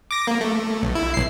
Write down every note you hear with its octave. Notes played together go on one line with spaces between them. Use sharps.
D6 A#6
A#3
A3
B1
E4
B1 C7